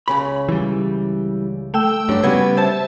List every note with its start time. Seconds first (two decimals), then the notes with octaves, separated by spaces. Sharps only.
0.08 C#2 C#3 B5
0.49 E3 G3
1.74 A3 G5 E6
2.09 G2 F#3 D4
2.24 C#3 G3 B3 D4 F#4 G#6
2.57 C5 E5 A5